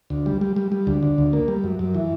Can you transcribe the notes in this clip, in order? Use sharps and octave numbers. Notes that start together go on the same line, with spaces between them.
D2
G3
G3
G3
G3
D2
D3
D2
A#3
G3
F#2
F#2
E3